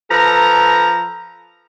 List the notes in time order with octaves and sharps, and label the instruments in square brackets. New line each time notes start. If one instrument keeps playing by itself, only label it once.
[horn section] F3 A4 B4 A#5